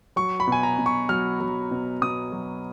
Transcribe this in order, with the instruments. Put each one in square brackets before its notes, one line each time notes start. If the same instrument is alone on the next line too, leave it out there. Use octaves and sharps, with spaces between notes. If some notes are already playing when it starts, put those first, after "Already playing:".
[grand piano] F#3 C#6
B5
B2 G#5
A#5
B2
C#6
F#3 F6
F#3
B2
B2 D#6
F#3